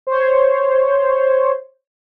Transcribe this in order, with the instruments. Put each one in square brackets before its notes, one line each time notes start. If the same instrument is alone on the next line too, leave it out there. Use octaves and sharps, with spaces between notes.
[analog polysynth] C5 C#5